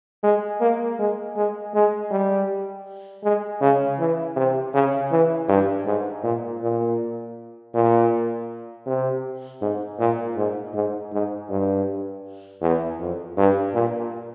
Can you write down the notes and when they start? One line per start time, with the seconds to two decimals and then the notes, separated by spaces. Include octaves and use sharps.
0.23 G#3
0.60 A#3
0.99 G#3
1.36 G#3
1.74 G#3
2.11 G3
3.23 G#3
3.61 C#3
3.99 E3
4.36 C3
4.74 C#3
5.11 E3
5.48 G2
5.86 G#2
6.23 A#2
6.61 A#2
7.74 A#2
8.86 C3
9.61 G#2
9.99 A#2
10.36 G#2
10.74 G#2
11.12 G#2
11.50 G2
12.61 E2
12.99 F2
13.37 G2
13.74 A#2